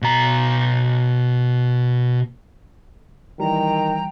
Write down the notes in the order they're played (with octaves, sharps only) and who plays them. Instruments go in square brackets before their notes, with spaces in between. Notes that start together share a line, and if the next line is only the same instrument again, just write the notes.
[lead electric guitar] B2 A#5
[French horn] D#3 [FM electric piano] E3 G3 [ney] G5 [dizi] A#5